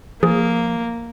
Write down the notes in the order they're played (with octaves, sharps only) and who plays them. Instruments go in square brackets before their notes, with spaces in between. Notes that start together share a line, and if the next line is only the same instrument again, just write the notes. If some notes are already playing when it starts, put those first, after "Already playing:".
[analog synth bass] F3 [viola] A#3 [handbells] G#4